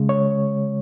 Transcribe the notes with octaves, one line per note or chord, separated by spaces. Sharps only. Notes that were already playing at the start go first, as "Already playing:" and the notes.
Already playing: C#3 G#3
C#5